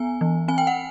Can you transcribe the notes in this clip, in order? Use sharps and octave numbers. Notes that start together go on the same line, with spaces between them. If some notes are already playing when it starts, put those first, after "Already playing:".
Already playing: B3 G#5
E3
C4 G#5
G5
F#5